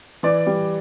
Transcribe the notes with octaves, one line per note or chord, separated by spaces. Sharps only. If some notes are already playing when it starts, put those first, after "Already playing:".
E3 D5
G3